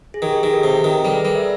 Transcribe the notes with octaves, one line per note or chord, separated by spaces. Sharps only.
G#4
D#3 G4
G#4
D#3 G#4 A#4
G4 A4
C3
D#3
G3 A4 B4
G#4 A#4
G3 G#4 A#4
D5 E5